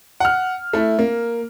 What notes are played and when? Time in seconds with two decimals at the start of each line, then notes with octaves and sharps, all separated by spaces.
0.20 F#5 F6
0.73 A3 E4
0.99 A#3